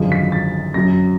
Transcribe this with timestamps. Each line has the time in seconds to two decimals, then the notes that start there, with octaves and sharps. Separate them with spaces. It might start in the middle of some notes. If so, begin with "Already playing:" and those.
Already playing: G#1 F#2 D3 F3 G#3
0.12 B6
0.32 A6
0.74 F#2 C#3 F#3 A#6